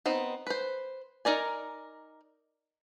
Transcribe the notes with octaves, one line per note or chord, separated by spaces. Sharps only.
B3 C4 D#4
B4 C5
D#4 A#4 D5 G#5